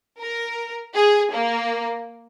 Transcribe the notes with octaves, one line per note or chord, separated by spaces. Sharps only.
A#4
G#4
A#3